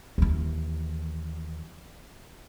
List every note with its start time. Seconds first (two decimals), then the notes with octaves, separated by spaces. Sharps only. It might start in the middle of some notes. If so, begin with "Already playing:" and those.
0.18 D#2 E3